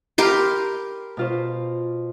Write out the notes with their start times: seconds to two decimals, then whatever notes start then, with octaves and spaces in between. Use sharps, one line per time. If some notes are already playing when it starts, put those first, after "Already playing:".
0.18 G4 A#4 B5 C6 F6
1.17 B2 F4 C5